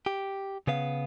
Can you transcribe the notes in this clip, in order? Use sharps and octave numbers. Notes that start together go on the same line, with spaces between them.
G4
C#3 B3 F5